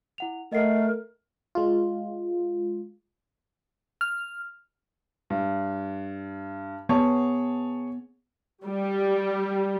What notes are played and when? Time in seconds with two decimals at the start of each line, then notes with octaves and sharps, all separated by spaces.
0.18 E4 F#5 F7
0.52 A3 A#4 D#5 F#5 C7
1.55 G#3 F4
4.01 F6
5.30 G2
6.89 B3 G#4 C#5 A5
8.64 G3